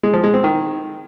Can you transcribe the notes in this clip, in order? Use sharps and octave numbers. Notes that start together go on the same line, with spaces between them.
G#3
F3
G#3
C4
D#3